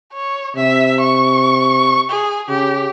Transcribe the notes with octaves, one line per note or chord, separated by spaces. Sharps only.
C#5
C3 E5
C#6
G#4
C#3 G4